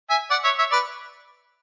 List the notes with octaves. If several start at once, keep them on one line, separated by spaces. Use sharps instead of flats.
E5 G#5
D5 F#5
C#5 E5
C#5 E5
B4 D5